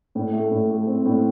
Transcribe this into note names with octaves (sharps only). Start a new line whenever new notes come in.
A2
A3
A2
A3
C4
A2